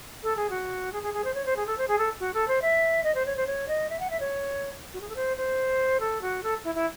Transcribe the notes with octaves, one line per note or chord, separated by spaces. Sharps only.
A4
G#4
F#4
G#4
G#4
G#4
C5
C#5
C5
G#4
A4
C5
G#4
A4
F#4
A4
C5
E5
D#5
C5
C#5
C5
C#5
D#5
E5
F#5
E5
C#5
F#4
G#4
A4
C5
C5
A4
F#4
A4
E4
E4